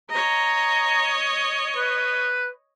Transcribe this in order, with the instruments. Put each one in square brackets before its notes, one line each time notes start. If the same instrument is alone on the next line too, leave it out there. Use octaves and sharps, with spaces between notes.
[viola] C#5 D#5 [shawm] A#5
[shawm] B4